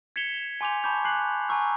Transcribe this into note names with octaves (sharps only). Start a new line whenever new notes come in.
G#6 B6 C#7 E7 F7 G7
G#5 C6 D6 G6 F7
A5 B5 C#6 D6 G6
G#5 F#6 C7 F#7
G#5 A#5 C#6 E6